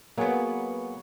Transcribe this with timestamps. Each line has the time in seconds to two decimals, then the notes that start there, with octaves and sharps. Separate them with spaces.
0.18 F#3 A#3 B3 G#4